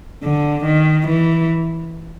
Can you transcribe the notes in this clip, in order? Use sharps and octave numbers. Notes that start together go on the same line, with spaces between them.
D3
D#3
E3